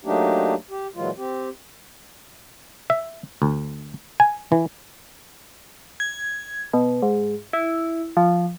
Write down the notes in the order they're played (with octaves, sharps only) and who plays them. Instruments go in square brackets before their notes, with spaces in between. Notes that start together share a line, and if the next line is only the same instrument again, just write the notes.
[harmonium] F#3 A3 A#3 D4 D#4 G4
G4
A#2 E3 F#3 G#3 F4
C4 G4
[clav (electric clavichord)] E5
D2
G#5
E3
[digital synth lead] G#6
B2
G#2
E4
F3